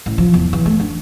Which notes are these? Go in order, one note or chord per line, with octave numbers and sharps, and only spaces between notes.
A1
F3
E2
E3
A3
D4